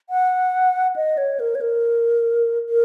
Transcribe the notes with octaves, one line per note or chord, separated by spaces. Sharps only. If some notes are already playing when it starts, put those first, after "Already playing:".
F#5
D#5
C#5
A#4
C#5
A#4
A#4